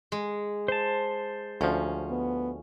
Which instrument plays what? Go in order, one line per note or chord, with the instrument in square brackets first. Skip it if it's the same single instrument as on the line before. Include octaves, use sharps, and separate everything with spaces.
[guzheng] G#3
[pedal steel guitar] C5 A5
[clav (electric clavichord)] D2 F3 [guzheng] C#4
[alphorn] B3